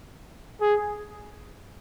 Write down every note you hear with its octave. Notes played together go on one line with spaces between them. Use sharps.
G#4